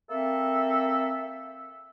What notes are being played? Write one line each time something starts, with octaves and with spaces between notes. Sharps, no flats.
A#3 C4 A4 E5